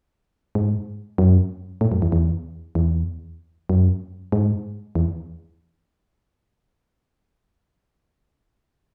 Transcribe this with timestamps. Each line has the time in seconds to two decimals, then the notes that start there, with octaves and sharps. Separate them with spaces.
0.55 G#2
1.18 F#2
1.81 A2
1.92 F#2
2.02 E2
2.12 E2
2.75 E2
3.70 F#2
4.32 G#2
4.95 E2